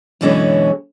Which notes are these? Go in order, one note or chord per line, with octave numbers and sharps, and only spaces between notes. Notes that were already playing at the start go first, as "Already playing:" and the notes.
F#2 B2 D3 E3 G#3 C#4